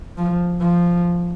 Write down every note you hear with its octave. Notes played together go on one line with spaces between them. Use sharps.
F3
F3